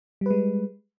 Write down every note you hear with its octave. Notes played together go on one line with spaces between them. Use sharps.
G3 G#3 B4